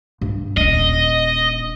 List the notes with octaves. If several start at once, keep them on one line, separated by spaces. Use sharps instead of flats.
G2
D#1 D4 D#5